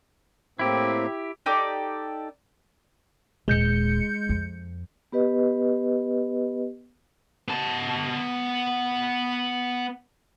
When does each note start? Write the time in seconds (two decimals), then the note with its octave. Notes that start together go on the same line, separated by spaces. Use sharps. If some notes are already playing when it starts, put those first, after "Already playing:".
0.59 A2 A#3 C4 E4 G4
1.46 D#4 G4 A4 D5
3.48 D#1 G#3 G6 C#7
4.29 F2
5.12 B3 G4 B4 D#5
7.48 B3 A5